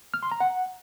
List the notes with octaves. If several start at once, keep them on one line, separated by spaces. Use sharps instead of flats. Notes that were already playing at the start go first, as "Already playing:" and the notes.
F6
C6
A#5
F#5